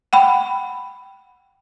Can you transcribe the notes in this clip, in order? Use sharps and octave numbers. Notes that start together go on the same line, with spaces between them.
F#5 G5 B5